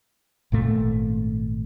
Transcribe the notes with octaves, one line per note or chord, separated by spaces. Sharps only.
G#1 A#2 A3